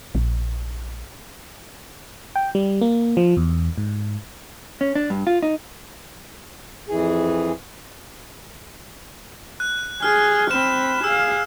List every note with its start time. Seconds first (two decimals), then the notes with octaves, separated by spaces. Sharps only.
0.15 A#1
2.36 G5
2.55 G3
2.81 A#3
3.17 F3
3.37 E2
3.78 G#2
4.81 C#4
4.95 D4
5.10 G2
5.27 F4
5.43 D#4
6.89 F2 E3 G#4
9.60 F#6
10.03 G#4 F6
10.51 C4 B5 E7
11.04 G#4 F5 E6